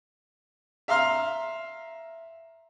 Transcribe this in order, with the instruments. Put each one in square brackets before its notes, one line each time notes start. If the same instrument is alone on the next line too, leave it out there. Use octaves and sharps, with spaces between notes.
[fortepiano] E5 F5 A#5 C6 F6